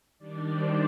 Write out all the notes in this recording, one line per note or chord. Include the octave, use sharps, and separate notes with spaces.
D#3 G3 D4 D5
C5